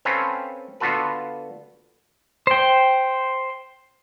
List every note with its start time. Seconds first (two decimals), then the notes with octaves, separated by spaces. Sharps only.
0.05 C4 C#4 A4 B4 F5
0.80 D3 B3 F4 F#4 A4 B4
2.47 C5 G5